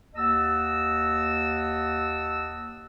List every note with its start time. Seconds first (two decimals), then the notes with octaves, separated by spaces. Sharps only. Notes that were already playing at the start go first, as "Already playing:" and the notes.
0.15 D#2 D#5 F#5 A5 E6